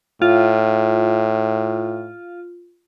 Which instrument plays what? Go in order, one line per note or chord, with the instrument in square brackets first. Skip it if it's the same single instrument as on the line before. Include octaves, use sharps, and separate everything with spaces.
[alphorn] A2 [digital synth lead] F4